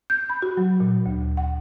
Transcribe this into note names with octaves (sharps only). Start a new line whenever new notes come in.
G6
B5
F#4
F#3
A#2
D2
F#5